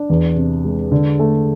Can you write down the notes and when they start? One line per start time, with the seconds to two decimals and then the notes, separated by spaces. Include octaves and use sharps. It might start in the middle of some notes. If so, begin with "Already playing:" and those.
Already playing: D4
0.10 E2
0.36 C3
0.65 G#3
0.92 D3
1.19 A3